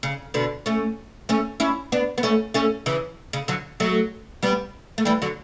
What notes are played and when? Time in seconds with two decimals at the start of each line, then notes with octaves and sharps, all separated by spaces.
0.03 C#3
0.34 B2 D3
0.66 A3 C#4
1.29 A3 C#4
1.60 C#4 E4
1.92 B3 D4
2.18 B3
2.23 A3 C#4
2.54 A3 C#4
2.86 C#3 E3
3.33 C#3
3.48 D3 F#3
3.80 F#3 A3
4.43 G3 B3
4.98 A3
5.05 E3 G3
5.22 D3 F#3